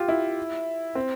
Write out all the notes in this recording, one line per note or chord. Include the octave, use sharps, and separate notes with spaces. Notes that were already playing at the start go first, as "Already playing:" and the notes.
Already playing: F4 G4
E4
C4